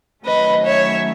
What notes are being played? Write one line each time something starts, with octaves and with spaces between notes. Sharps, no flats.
D#3 F#3 A3 C#4 B4 D#5
C#5 E5